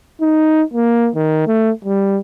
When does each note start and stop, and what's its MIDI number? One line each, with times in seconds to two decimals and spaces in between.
0.22 0.63 63
0.74 1.09 58
1.16 1.46 51
1.47 1.70 57
1.85 2.19 55